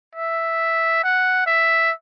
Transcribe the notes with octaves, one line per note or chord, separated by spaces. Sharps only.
E5
F#5
E5